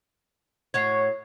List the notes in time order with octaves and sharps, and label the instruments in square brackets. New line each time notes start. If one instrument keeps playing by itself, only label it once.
[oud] A2 F#4 C#5 [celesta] G#6 C7